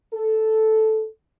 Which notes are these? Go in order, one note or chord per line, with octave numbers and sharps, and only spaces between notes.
A4